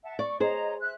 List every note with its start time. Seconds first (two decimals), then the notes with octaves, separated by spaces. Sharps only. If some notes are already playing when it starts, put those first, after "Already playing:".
0.03 E5 F#5 A5
0.19 D5 C#6
0.40 G#4 C5 C#5 D#5 A#5
0.81 E5 F#6